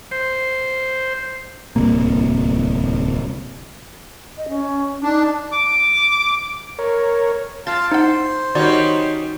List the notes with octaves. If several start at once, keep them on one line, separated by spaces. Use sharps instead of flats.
C5
D1 C2 C3 A#3
D#5
C#4
D4 D#4
D6
A#4 C#5
F4 F5 G5 A5 A6
D#4 C5 F#5
D#3 G3 C#4 D#4 F#4 C#5 D5